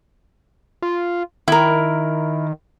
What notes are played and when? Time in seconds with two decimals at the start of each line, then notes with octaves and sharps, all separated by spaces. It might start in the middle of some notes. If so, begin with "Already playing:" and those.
0.82 F4
1.48 D#3 E4 A#4